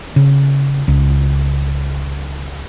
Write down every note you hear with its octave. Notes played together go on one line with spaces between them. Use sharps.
C#3
C#2